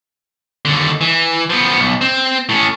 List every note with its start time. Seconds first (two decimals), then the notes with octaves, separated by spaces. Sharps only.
0.65 D#2 D3
1.01 E3
1.50 F3 B3
1.78 B1
2.01 C4
2.49 A2 C#4